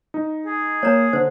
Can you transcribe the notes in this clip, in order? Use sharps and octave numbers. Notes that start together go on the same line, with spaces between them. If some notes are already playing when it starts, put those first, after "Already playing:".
D#4
G#4
A#3 C#5 A#5
D3 C5